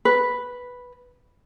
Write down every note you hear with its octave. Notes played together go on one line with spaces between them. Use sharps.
B4